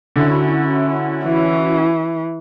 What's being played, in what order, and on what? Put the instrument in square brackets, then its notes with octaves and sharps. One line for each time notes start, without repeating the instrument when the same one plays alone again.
[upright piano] D3 [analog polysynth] C#4 E4 F#4
[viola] E3